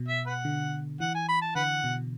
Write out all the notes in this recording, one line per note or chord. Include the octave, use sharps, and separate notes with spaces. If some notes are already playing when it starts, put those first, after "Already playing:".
Already playing: B2
E5
B4 F#5
D3
E3 F#5
G#5
B5
A5
D3 B4 F#5
B2